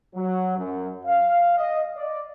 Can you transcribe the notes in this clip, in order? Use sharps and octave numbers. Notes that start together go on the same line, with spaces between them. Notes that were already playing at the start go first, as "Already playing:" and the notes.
F#3
F#2
F5
D#5
D5